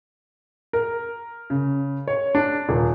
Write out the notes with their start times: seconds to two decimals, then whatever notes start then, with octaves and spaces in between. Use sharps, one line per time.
0.73 A#4
1.50 C#3
2.08 C#5
2.35 D4
2.69 D#1